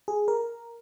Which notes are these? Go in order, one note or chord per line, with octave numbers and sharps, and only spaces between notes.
G#4
A#4